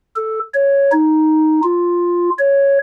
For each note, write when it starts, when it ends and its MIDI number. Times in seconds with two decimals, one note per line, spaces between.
0.16 0.39 69
0.54 0.92 73
0.92 1.61 63
1.63 2.30 65
2.39 2.79 73